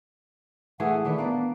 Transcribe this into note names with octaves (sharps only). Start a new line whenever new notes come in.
E3 A3 G#4 F#5
D#3 A3 D4 B4
A#3 B3 D5